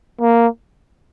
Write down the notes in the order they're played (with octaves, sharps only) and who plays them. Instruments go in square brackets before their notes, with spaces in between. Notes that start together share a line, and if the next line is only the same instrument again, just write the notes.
[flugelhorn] A#3